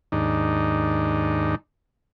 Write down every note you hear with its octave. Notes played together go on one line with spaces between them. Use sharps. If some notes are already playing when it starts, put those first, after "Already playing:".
D#2 G#2 D4 D#4